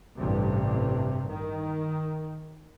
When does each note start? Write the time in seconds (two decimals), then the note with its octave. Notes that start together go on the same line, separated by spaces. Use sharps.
0.17 A1 G2 C3
1.28 D#3